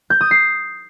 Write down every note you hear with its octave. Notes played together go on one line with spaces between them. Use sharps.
G6
D#6
C7